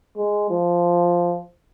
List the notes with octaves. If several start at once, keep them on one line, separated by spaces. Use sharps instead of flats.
G#3
F3